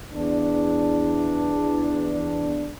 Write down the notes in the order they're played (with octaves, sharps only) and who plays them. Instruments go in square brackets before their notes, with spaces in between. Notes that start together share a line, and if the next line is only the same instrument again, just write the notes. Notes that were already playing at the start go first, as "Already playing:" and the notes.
[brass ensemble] E2 D4